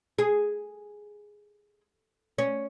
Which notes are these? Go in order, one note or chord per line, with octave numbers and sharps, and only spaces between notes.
G#4
C#4